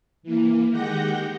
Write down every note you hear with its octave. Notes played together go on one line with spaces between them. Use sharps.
E3 A#3
D#3 G#3 G4 F#5 G6 A#6